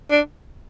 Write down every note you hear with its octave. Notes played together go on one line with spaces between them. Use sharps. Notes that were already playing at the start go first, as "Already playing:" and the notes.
D4